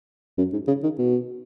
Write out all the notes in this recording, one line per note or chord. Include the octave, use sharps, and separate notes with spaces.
F#2
G#2
C#3
D#3
B2